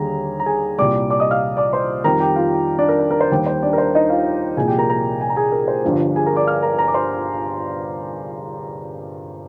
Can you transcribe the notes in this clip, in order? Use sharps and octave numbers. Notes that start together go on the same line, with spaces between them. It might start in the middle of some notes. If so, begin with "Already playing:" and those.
Already playing: D#2 D3 G3 G#4 A#5
A#5
G#4 G#5
C2 A#2 G3 D5 D6
D5 D6
D#5 D#6
F5 F6
D5 D6
C5 C6
F2 D#3 G3 A#4 A#5
G4 G5
F4 F5
D4 D5
A#4
A#4
A#4
C5
D#2 D#3 G3 G4 G5
C5
D4 D5
A#4
C5
D#4 D#5
F4 F5
C2 A#2 F3 G#4 G#5
G4 G5
A#4 A#5
A#4 A#5
G#5
A#5
G#4 G#5
A#4
C5
G1 G2 F3
G#4 G#5
A#4 A#5
D5 D6
F5 F6
A#4 A#5
A#4 A#5
D6
C5 C6